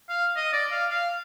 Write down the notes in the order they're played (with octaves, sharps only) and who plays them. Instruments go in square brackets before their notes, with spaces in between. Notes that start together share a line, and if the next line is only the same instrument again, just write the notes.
[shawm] F5
D#5
D5
F5
F5